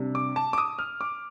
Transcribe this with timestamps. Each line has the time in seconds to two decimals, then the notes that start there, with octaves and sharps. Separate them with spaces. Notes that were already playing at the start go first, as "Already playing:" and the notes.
Already playing: C3 G3 D4
0.15 D6
0.36 A5
0.53 D6
0.58 D#6
0.79 F6
1.01 D6